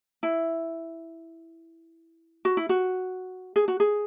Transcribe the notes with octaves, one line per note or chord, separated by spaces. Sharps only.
E4
F#4
E4
F#4
G#4
F#4
G#4